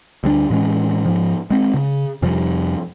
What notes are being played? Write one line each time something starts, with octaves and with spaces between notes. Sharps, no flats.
D2 G3 A#3 D4
A2 E3 G#3 C#4
G#2 F3
G#3 C4
C#3
F2 C3 F3 G3